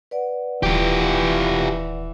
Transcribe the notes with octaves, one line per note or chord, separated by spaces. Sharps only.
B4 D5 F#5
D#1 E3 F4 G4